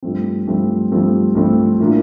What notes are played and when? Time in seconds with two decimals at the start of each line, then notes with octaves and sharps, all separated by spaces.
0.03 G2 F3 A3 C4
0.47 G2 F3 A3 C4
0.92 G2 F3 A3 C4
1.35 G2 F3 A3 C4
1.80 A2 E3 A#3 D4 F4